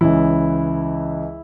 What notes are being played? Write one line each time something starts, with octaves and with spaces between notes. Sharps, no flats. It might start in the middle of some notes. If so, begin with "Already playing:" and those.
C#2 C#3 E3 E4